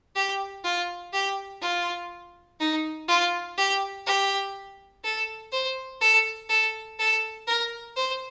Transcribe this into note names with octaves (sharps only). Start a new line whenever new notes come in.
G4
F4
G4
F4
D#4
F4
G4
G4
A4
C5
A4
A4
A4
A#4
C5